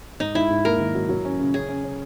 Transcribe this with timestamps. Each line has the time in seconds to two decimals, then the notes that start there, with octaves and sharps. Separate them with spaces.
0.20 G#2 D#4
0.35 G#2 E4
0.50 G#2
0.65 A#3 A#4
0.80 D#3
0.95 F#3
1.09 F#3
1.25 C#4
1.40 C#3
1.54 C#4 G#4
1.69 C#4
1.84 C#4